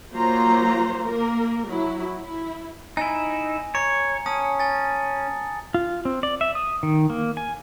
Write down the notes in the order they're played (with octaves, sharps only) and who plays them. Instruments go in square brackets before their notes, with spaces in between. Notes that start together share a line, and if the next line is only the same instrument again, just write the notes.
[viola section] F#3 A#3 F4 C5 A#5
A#3 A#4
F#3 E4
E4
[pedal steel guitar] D#4 E4 [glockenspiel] G#5
[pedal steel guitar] C#5 [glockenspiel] A#5 C#7
[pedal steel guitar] C#4 [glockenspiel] A5 D#6
[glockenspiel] G#5 A6
[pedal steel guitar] F4
C4
D5
E5
D#6
D#3
A#3
G#5